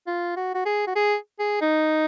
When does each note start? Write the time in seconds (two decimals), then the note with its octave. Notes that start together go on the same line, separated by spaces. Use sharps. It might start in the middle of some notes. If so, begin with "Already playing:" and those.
0.07 F4
0.37 F#4
0.55 F#4
0.65 G#4
0.87 F#4
0.95 G#4
1.39 G#4
1.61 D#4